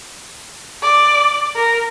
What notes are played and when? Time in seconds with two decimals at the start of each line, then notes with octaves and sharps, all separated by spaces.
0.83 D5
1.55 A#4